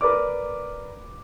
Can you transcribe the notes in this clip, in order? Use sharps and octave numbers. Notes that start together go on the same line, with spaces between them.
A#4 B4 D5 D6